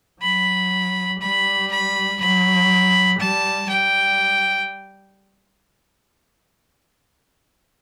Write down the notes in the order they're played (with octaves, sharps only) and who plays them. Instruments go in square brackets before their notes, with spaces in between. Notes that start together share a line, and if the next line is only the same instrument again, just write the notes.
[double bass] F#3 [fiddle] B5
[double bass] G3 [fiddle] B5
[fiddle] B5
[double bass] F#3 [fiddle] B5
[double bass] G3 [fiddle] A5
[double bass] G3 [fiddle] G5